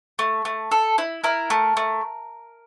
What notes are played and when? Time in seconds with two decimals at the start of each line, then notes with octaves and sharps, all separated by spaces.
0.19 A3
0.45 A3
0.71 A4
0.98 E4
1.24 E4 A#4
1.50 A3
1.77 A3